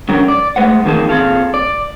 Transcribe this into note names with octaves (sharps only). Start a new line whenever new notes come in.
G#2 D3 F#3 C#4 G4 A#4
D5
G#3 A3 B4 C5 F#5
F2 D#3 A#3 D#4 G#4 A5
A#2 C4 G#4 A4 F5
D5